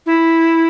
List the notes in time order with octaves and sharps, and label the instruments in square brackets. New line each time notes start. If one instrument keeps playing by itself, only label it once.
[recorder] E4